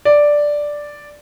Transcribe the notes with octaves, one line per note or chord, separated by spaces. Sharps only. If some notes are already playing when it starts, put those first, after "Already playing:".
D5